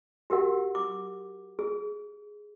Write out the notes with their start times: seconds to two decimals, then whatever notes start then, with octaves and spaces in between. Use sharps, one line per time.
0.30 F#4 G4 A#4 F#5
0.75 D6
1.59 G#4